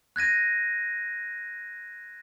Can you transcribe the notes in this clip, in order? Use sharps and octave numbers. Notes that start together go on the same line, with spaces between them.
F#6 G#6 A#6 D#7